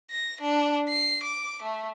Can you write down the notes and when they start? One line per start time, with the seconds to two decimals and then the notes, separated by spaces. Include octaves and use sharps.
0.11 A#6
0.41 D4
0.89 C7
1.23 D6
1.62 A3